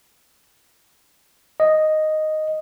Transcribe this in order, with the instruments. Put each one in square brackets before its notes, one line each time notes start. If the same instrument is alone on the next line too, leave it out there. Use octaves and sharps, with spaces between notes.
[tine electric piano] D#5